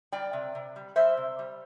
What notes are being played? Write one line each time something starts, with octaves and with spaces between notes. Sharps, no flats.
G3 D5 G5
C3
C3
G3
G3 C5 E5
C3
G3